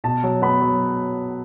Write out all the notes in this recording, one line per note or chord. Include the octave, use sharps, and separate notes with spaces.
B2 A5
F#3
B3 B5
F#3